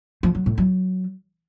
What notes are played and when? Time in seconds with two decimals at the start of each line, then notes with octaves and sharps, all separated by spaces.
0.23 F3
0.35 F#3
0.46 A2
0.58 F#3